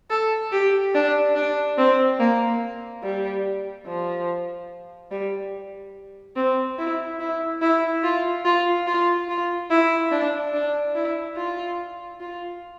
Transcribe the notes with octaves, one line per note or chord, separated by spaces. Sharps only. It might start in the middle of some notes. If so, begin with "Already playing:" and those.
A4
G4
D4
D4
C4
A#3
G3
F3
G3
C4
E4
E4
E4
F4
F4
F4
F4
E4
D4
D4
E4
F4
F4